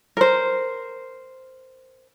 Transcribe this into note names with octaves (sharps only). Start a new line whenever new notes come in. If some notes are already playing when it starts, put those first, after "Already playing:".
A#4 C5